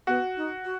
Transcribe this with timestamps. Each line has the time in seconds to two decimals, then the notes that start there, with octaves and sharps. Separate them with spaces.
0.07 B3 F#4
0.36 D#4
0.64 F#4